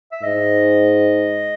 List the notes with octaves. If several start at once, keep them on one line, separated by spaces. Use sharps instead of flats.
E5
G#2 D#5